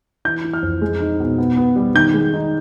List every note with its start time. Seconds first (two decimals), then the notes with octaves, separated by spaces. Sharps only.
0.25 E3 G6
0.44 E3
0.54 F6
0.62 F2
0.81 G#3
1.00 D#4
1.20 B2
1.38 B3
1.57 B3
1.76 G3
1.95 D#3 G6
2.14 G#3
2.34 D#4